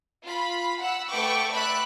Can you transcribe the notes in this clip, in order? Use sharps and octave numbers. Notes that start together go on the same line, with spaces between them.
F4 B5
F#5 E6
A3 B4 G5 C#6 D6
D5 E5 B5 F#6